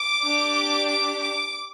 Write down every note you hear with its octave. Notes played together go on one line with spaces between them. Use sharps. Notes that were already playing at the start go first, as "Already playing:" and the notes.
Already playing: D6
D4 G4
D6
D6